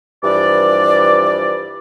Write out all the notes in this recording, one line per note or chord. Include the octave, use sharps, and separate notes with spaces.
G2 E3 F3 G4 D5